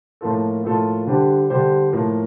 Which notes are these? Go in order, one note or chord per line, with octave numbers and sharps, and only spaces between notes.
A2 F3 A#3 F4 A4
A2 F3 A#3 F4 A4
D3 G3 D4 G4 C5
D3 G3 D4 G4 C5
A2 F3 A#3